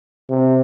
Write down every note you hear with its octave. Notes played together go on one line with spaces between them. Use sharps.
C3